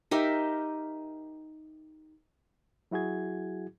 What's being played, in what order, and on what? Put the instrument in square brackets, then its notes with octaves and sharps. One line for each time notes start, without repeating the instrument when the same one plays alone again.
[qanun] D#4 G4 A#4 E5
[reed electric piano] F#3 E4 F#4 G#4 G#6